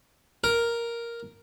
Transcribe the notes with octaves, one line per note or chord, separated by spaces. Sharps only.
A#4